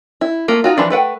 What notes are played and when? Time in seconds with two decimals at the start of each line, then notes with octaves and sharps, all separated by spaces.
0.21 E4
0.48 A3 A#3 F4
0.64 D#4 F4 F#4
0.77 E3 F3 D4 E4
0.90 A3 B4 F#5 G5